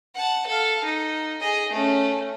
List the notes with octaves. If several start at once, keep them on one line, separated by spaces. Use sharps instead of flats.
F#5 A5
A4 F5
D#4
G#4 D#5
A3 C#4